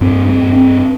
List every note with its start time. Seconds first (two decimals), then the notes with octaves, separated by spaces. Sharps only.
0.01 G2 C4
0.29 C4
0.43 G2
0.56 C4